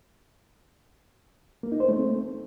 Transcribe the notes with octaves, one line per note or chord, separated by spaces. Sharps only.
A#3
D#4
C5
A3
C4